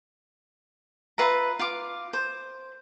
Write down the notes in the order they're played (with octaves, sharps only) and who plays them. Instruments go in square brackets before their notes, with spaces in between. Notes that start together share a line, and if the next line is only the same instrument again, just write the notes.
[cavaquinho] F4 B4 E5 A#5
F4 F5 D6
C5